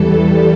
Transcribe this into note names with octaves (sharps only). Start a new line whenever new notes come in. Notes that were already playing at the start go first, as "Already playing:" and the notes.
Already playing: E2 E3 G3 A4